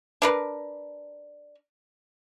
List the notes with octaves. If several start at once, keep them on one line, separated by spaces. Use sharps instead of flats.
D4 A#4 B4